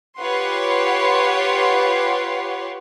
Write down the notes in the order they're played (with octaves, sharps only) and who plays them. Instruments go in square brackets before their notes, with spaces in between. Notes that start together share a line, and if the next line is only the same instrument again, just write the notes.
[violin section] F4 G4 B4 C#5 F#5 C6